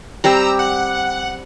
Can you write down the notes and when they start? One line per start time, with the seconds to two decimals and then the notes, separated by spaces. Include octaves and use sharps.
0.24 G3 C4 G4 A#5 E6
0.59 F#5